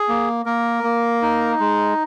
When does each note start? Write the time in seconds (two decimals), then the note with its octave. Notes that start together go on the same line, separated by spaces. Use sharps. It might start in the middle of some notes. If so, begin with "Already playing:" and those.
Already playing: G#4
0.08 A#3
0.46 A#3 A#4
0.84 A#3
1.22 D#4
1.60 G#3